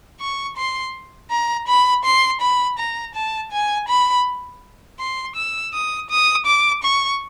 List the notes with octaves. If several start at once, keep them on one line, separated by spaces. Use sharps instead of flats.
C#6
C6
A#5
B5
C6
B5
A#5
A5
G#5
B5
C6
E6
D#6
D#6
D6
C#6